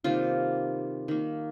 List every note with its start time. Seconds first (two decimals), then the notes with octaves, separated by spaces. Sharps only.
0.04 C3 D#3 G3 A#3 F4
1.08 D#3 A#3